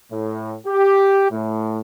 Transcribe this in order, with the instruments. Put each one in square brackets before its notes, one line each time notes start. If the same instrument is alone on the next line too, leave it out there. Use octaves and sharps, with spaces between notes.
[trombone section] A2
G4
A2